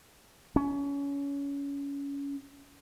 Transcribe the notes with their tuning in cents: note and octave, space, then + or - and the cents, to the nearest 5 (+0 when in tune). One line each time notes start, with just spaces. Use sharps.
C#4 +25